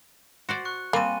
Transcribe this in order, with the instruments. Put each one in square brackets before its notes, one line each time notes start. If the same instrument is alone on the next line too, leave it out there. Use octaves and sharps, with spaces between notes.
[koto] F#4 C5 D5
[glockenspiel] C#6 F#6 C#7
[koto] G3 C4 [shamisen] A#3 [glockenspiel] G#5 C6 D#7